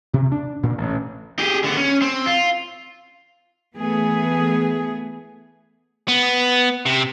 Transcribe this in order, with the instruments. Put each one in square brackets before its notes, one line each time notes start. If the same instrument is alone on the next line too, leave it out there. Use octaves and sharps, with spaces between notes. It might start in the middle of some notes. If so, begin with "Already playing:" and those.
[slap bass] C3
D4
A#2
A1
[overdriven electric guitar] G4 G#4
D3 B3
C#4
C4
F4
[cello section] E3 A3 B3 G#4
[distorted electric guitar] B3
C3